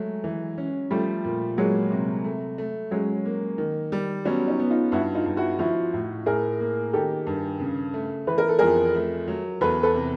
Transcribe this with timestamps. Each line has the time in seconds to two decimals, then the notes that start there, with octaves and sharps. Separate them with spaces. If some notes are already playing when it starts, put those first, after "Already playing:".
Already playing: F#3 G#3 A3
0.24 E3
0.58 C#4
0.91 F3 G3 A3
1.25 A#2
1.57 F#3 G#3 A#3
1.91 C3
2.24 A3
2.58 A3
2.91 F#3 G#3 C#4
3.25 A#3
3.58 D#3
3.92 G3
4.25 F#3 B3 C#4
4.48 C#4 D#4
4.59 B3
4.70 D#4 F4
4.92 G2 E4 F#4
5.15 D#4 F4
5.26 G2
5.37 E4 F#4
5.59 F3 E4 F#4
5.93 A2
6.26 A2 G#4 A#4
6.60 A#3
6.93 D#3 G4 A4
7.27 G2
7.60 C#3
7.94 A3
8.27 E3 B4
8.38 A#4
8.48 A4
8.59 F2 G#4 A#4
8.95 A3
9.28 F#3
9.61 E2 A4 B4
9.83 A4 B4
9.94 C3